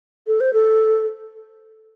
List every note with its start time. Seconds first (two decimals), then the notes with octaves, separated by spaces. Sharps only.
0.27 A4
0.40 C5
0.53 A4